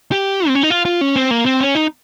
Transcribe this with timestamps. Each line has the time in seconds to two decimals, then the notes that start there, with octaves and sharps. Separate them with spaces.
0.12 G4
0.48 C4
0.55 C#4
0.63 D#4
0.70 F4
0.85 F4
1.01 C#4
1.16 C4
1.31 A#3
1.46 C4
1.61 C#4
1.75 D#4